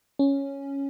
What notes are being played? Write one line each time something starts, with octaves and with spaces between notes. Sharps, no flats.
C#4